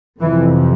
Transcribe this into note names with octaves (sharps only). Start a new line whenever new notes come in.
F2 C3 E3